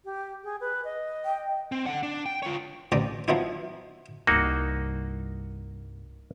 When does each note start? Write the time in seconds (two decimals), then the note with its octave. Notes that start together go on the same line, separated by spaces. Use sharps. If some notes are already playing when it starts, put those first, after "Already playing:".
0.05 G4
0.44 G#4
0.60 B4
0.84 D#5
1.25 G5
1.72 C4
1.86 D3 F#5
2.03 D4
2.26 G5
2.42 F4 C#5
2.92 A1 C4 G4 D5 A#5 D#6
3.28 F3 F#3 B3 C4 D#4 E4
4.27 C2 G2 A#3 D#4 F#4